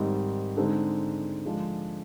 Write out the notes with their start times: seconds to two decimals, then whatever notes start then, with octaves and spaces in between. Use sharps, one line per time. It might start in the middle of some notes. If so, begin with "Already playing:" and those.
Already playing: G#2 D#3 G3 C4 D#4
0.57 D3 G#3 C4 D#4 G#4
1.45 D3 F3 G#3 D4 F4